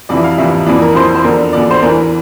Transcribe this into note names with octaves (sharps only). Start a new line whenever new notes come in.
F2 C3 E3 D5
E5
F5
F2 C3 E3 E5
F2 E3 D5
A#4
F2 E3 C5
C5
E2 D3 F3 A#4
E2 D3 F3 D5
C5
E2 E3 A#4